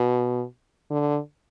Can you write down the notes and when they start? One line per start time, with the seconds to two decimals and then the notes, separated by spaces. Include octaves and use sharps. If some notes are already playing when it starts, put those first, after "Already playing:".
Already playing: B2
0.91 D3